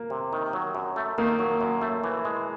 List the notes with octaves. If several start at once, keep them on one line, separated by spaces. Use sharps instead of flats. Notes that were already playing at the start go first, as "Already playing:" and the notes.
Already playing: A#3
C3
D#3
F#3
F#2
A3
D#3 A#3
F#3
F#2
A3
E3
G#3